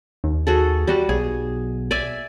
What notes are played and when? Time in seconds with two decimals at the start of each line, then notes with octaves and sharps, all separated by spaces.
0.24 D#2
0.47 F#4 G#4 A4
0.87 G3 F#4 A5
1.09 B1 G#4
1.91 D5 E5 G#5